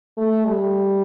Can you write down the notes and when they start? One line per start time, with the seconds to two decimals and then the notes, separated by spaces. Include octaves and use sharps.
0.18 A3
0.47 G3